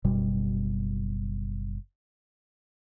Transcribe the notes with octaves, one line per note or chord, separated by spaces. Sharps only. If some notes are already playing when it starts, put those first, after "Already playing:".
F#1 B2 G3